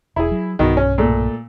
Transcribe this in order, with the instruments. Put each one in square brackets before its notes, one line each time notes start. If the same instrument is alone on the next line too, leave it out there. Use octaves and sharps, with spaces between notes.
[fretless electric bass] E1 [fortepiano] E4 G#4
[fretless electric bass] F#3
[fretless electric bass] B1 G2 [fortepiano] D#3 B3 F#4
[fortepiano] C#4
A#2 A3